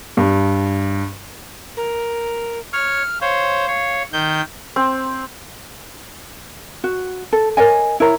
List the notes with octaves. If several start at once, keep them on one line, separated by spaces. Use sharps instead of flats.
G2
A#4
C#5 F6
C5 C#5 F5
C#5
D#3 G6
C4
F#4
A4
A#4 C#5 D#5 G#5
E4 A#4 C#5 A#5